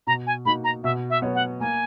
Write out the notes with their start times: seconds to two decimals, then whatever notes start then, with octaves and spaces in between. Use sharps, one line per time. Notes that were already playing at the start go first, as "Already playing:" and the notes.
0.07 B2 A#5
0.27 G#5
0.45 A#3 D#4 F#4 B5
0.64 A#5
0.84 B2 E5
1.10 E5
1.22 F#3 B3 F#4 C#5
1.35 F#5
1.60 A#3 G#5